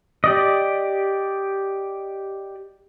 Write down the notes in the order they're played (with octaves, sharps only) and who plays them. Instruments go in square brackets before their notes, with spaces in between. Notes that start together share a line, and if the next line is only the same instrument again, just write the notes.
[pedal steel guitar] G4 D5 D#5